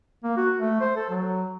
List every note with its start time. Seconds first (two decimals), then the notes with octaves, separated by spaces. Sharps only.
0.23 A#3
0.37 F#4
0.59 A3
0.81 C5
0.96 A4
1.10 F#3